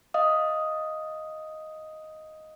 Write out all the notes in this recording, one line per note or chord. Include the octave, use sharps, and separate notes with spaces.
D#5 F5 D#6